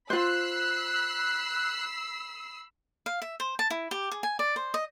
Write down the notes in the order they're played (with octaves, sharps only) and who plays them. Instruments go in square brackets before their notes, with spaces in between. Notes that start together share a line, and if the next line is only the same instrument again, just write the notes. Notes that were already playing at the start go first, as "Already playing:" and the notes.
[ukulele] F4 C5 [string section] B5 E6 C7 [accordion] F#6
[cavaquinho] F5
E5
C5
A5
E4
G4
G#4
G#5
D5
C5
D#5